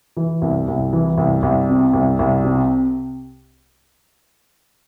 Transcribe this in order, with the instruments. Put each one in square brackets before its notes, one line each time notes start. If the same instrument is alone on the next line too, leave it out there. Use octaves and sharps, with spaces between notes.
[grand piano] E3
C2
C2
E3
C2
C2
C3
C2
C2
C3